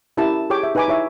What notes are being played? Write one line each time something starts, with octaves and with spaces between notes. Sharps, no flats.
C#4 E4 G4 A#4 A5
G4 G#4 C#5 G5 D6
E5
D#4 B4 C#5 G#5 B5 D6
E4 C#5 E5